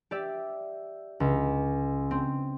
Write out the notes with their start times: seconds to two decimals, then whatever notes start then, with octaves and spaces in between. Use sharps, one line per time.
0.11 G4 D5 E5
1.20 C#2
2.11 C4